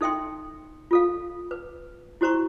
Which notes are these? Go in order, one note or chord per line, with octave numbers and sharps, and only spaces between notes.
D#4 A4 E5 G5 C6
F4 A4 F5
B4
E4 F#4 C5 A#5 C#6